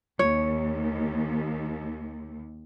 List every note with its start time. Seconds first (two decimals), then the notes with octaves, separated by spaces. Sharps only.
0.19 D#2 C#5